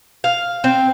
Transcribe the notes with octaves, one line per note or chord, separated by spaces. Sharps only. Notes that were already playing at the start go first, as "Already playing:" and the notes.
F5
C4